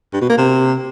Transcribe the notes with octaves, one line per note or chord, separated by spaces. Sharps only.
G2
B2
A#3
C3